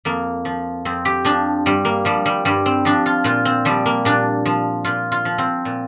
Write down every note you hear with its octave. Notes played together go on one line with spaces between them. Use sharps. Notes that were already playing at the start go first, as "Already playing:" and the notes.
F2 A#3
F3
F2 C4
G4
F3 D4
G2 G3
A#3
F3 G3
G3
G2 G3
C4
F3 D4
F4
A#2 F4
C4
F3 G3
A#3
A#2 D4
F3
A#2 F4
F4
F3
C4
A#2